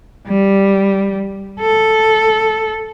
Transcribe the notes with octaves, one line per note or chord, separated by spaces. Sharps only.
G3
A4